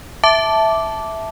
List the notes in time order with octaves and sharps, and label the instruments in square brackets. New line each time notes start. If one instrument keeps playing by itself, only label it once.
[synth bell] E5 A5 D6